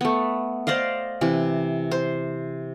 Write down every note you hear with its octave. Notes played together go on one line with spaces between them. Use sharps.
A3 B3
C5 D5 D#5 F5
C3 E3
C5